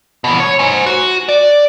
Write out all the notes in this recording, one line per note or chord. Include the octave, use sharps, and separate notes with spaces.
B2 E3
C#5
C5 G#5
F#4
D5